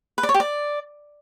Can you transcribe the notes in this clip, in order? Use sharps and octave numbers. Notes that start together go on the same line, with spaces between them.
B4
D5
C#5
G4
D5